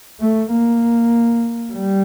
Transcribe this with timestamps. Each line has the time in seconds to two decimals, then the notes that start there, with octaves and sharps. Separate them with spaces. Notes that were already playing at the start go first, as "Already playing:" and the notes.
0.20 A3
0.51 A#3
1.73 G3